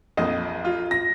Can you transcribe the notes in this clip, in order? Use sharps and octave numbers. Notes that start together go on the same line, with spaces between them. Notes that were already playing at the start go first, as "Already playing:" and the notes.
A#1 F2 D#5
F4
A#6